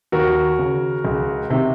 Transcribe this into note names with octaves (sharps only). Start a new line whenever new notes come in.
D#2 F#4 A#4
C#3
C#2
C3 D#3